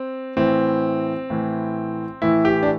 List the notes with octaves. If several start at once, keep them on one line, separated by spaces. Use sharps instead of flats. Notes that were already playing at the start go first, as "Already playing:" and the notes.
Already playing: C4
A2 E3 C4
A2 E3
A2 E3 E4
G4
D4